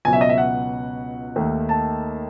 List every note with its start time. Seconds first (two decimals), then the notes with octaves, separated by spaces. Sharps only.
0.05 C#2 B2 F#3 G#5
0.13 E5
0.21 D#5
0.30 E5
0.38 F#5
1.36 D#2 D#3 A3
1.69 A5